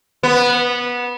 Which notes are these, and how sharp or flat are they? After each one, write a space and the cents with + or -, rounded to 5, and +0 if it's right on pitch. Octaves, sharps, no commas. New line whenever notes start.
B3 -15